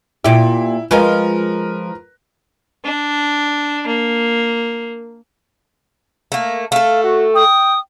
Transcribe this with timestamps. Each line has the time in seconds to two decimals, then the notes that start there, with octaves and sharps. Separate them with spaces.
0.24 A#2 E4 G4
0.91 F3 G#3 F4 A#4 B4
2.85 D4
3.87 A#3
6.32 A3 A#3
6.72 A3 A4 F5
7.04 F#4
7.35 G5 D#6